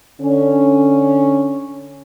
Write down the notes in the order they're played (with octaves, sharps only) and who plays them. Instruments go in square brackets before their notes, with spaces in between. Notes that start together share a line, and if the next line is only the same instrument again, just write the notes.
[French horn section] D3 C#4